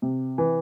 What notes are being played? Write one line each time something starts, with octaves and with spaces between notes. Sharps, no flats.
C3
E3